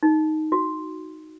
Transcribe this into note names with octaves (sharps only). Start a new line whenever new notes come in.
D#4
F#4